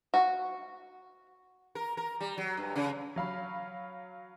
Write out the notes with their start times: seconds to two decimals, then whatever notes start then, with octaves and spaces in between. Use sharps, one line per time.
0.14 F#4
1.75 A#4
1.97 A#4
2.20 G3
2.37 F#3
2.57 G2
2.76 C#3
3.16 F#3 F5 B5